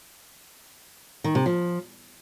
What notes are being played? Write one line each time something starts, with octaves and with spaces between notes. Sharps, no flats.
D#3
C3
F3